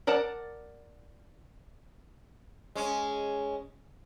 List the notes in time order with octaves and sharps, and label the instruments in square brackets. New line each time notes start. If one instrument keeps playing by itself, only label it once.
[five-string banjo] A#4 D5 F#5 A5
[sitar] G#3 C#4